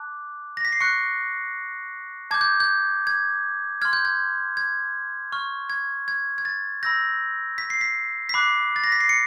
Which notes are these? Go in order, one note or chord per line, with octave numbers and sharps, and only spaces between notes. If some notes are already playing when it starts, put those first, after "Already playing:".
Already playing: A5 D6 F#6
A#6
B6
C7
C#6 F#6 C#7
A5 D6 G6 G#6
G6
G6
G#6
C6 F6 G#6
G6
G#6
G#6
C#6 F6
G#6
G#6
G#6
A6
B5 E6 G6 A#6
B6
C7
B6
B6
B5 D6 F#6 C7
A6
A#6
B6
C7
C#7